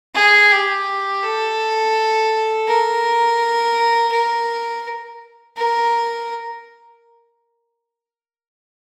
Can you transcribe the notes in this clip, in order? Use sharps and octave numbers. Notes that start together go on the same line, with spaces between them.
G#4
G4
A4
A#4
A#4
A#4